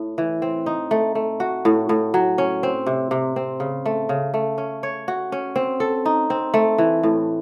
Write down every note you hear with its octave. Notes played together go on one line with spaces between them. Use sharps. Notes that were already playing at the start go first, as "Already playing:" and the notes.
Already playing: A2
E3
C4
D#4
A3
A3
F#4
A2
A2
F#3
C#4
C4
C3
C3
C4
C#3
A3
C#3
A3
C#4
C#5
F#4
C#4
C4
A4
D#4
C4
A3
E3
A2